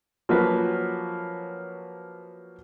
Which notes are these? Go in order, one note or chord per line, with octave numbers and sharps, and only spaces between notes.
F3 F#3 A#3 C#4 B4